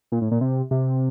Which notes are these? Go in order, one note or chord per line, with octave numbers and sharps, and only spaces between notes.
A#2
A2
A#2
C3
C3